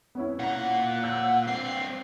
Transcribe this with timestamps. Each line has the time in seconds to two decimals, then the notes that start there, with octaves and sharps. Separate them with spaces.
0.15 B3 C#4 E4
0.39 A#2 F#5 A#5
1.03 E6 F#6 G6
1.47 G2 C4 C7